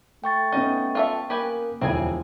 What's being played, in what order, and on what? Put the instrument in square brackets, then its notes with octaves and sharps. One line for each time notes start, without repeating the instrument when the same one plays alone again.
[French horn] A3 [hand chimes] G5 C#6 A6
[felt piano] B3 C#4 F#5 [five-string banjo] D#4
[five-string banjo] F4 A4 E5
[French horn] A#3 [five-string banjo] G4 B4 G#5
[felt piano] E1 D2 E4 [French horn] F3 [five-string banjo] C4 G#4 G#5